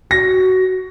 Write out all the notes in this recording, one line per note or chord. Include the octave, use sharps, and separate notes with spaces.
F#4 A#6